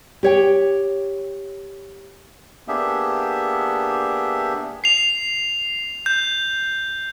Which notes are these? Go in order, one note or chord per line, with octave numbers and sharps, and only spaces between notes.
G4 C#5 G5
A#3 B3 D4 G4 G#4 E5
C7 F7
G6